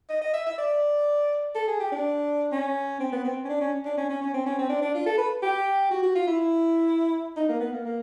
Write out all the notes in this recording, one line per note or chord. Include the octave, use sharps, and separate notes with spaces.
D#5
D#5
E5
E5
D5
A4
G#4
G4
D4
C#4
C4
B3
C4
C#4
D4
C#4
D4
C#4
C#4
C#4
C4
C#4
C4
D4
D4
F4
A4
B4
G4
F#4
F#4
F4
E4
D#4
A#3
B3
A#3
A#3